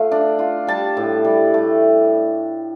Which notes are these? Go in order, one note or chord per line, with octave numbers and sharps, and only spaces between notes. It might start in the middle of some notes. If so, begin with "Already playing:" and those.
Already playing: A3 F4
D4
F4
G3 A5
A2
G3
A3